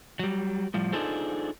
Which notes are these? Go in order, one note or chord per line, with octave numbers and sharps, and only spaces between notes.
F#3 G3
A2 F3 G3
D4 D#4 F4 G#4 A4 C5